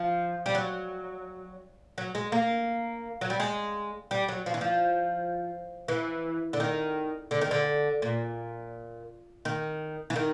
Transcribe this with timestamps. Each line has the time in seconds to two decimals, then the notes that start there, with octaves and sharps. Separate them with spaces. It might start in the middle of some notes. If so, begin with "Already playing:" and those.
Already playing: F3
0.46 G3
0.55 F#3
1.98 F#3
2.15 G#3
2.32 A#3
3.21 F#3
3.30 G3
3.40 G#3
4.11 G3
4.28 F#3
4.46 F3
4.54 E3
4.61 F3
5.88 E3
6.53 D3
6.60 D#3
7.31 D3
7.41 D#3
7.51 D3
8.02 A#2
9.45 D#3
10.10 E3
10.16 D#3